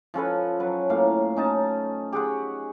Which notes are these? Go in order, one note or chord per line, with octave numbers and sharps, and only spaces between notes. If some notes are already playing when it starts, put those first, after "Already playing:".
F3 C#4 A4 B4
F#3 B4
A2 A#3 F5
C#4 D#4 A5
G4 G#4 F#5 C#6